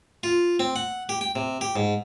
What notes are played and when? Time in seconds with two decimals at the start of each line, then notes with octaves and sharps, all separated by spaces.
0.23 F4
0.60 C4
0.76 F#5
1.09 G4
1.21 G5
1.36 C3
1.61 G4
1.76 G#2